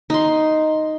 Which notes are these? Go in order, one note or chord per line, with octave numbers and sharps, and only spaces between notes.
D#4 C6